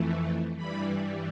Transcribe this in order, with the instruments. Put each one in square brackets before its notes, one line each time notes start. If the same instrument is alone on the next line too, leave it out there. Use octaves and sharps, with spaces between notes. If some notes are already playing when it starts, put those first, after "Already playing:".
Already playing: [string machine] F2 E3 A3
G2 E3 G3 B5